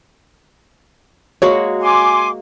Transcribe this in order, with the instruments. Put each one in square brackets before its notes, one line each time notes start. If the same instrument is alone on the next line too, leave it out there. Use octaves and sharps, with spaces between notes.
[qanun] G#3 A#3 F#4 [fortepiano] C#5
[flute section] G#5 C6 D6